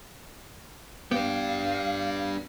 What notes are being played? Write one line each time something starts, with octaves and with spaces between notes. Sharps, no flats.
B3 D4 G4 F5